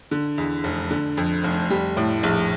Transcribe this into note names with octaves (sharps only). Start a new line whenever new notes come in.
D3
E2
F1
D3
F2
F1
G3
A2
A#1